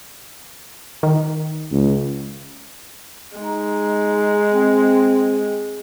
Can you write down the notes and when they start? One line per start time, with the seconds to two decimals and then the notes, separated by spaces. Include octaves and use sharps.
1.03 D#3
1.72 C#2
3.37 G#3 D#4
4.52 C4